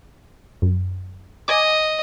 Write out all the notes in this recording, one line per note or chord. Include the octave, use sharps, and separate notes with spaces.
F#2
D#5 G#5 D6